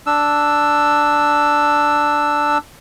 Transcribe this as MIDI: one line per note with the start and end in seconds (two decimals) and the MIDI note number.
0.07 2.58 62
0.07 2.58 88